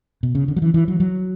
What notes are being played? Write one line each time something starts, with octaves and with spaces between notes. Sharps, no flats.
B2
C#3
D3
F#3
E3
E3
F#3
F#3